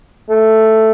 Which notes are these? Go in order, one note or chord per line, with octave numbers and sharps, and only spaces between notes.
A3